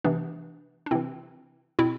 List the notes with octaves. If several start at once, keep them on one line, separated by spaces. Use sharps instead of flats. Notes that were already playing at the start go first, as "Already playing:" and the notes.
C3 E3 B3 D4
D4
C3 E3 C4 E4
B2 C4 E4